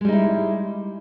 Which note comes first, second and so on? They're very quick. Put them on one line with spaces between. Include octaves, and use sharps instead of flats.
G#3 G3 D#4 E4